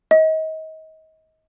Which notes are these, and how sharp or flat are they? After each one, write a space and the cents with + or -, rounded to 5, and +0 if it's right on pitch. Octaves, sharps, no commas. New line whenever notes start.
D#5 +30